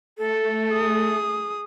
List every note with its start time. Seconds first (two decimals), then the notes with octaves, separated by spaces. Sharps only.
0.18 A3 A4
0.71 G#4 D#6